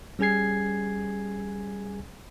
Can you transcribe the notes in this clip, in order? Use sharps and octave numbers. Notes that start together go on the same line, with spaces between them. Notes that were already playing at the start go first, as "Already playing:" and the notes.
G3 C#4 G#4 G#5 G#6 C7